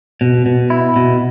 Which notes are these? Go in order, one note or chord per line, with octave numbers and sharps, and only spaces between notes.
B2
B2
E4
B2